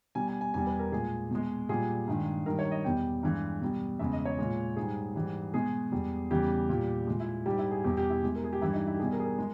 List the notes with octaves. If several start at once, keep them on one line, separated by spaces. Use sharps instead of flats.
B2 G3 G#5
G#5
G#5
E2 B2 G3 G#5
B4
A#4
A#2 G#3 G#4
B2 G#3
A#2 G3 G#4
G2 D#3 G#3
G2 D#3 G3 A#4
C#5
D#5
E2 B2 G3 G5
G2 E3 G#3
B2 G3
E2 C#3 G#3 E5
D#5
C#5
A#2 G#3
G#2 G3 G#4
G#2 E3 G3
B2 G#3 G#4
E2 B2 G3
E2 C#3 E3 G3 G4
A#2 G3
A#2 G#3
E4
G#2 G3 G4
E4
G#4
E2 B2 G3 G4
G4
E4
B2 G#3
A#4
G#4
G4
G2 E3 G3 E4
D#4
E4
G4
B2 G3 G#4
A#4
G#4
A#4
G#3